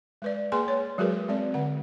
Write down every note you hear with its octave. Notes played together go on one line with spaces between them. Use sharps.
G#3 B4 D5
A#3 G#4 B4 G#5 C6
C#5
F#3 G#3 F#4 G#4 A#4 B4
G#3 C4 D5
D3 F#5